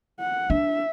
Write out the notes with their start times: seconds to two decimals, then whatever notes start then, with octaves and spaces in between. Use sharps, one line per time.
0.20 F#5
0.50 D4 E5